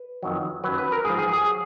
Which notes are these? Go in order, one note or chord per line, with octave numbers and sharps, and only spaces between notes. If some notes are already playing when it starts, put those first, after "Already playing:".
Already playing: B4
F2 D#3 F#3
F#2 D#3 F#3 B4
B4
A#4
G#2 F3 G#4
G#4
G#4
F#3